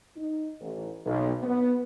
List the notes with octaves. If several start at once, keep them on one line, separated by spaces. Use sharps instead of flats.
D#4
A1
B1
B3